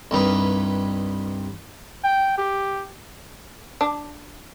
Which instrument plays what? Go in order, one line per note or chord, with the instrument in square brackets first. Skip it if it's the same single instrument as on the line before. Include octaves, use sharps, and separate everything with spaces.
[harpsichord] C2 G2 D#4 B4
[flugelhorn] G5
G4
[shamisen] D4